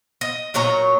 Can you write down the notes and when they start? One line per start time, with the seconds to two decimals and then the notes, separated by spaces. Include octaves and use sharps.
0.21 D#5
0.54 A#2 F#3 C#5 A#5